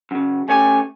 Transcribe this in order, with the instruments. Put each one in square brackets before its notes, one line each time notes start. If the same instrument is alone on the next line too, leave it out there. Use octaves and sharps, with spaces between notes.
[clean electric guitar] F#2 C#3
[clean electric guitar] A3 C#4 G4 [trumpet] G#5